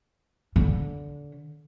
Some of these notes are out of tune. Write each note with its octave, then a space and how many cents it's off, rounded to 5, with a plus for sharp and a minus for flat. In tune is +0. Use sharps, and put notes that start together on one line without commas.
D3 -20